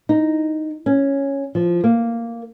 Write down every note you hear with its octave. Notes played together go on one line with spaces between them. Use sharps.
D#4
C#4
F3
A#3